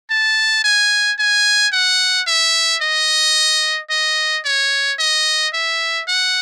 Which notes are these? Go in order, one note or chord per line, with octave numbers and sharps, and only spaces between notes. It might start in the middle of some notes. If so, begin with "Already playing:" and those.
A5
G#5
G#5
F#5
E5
D#5
D#5
C#5
D#5
E5
F#5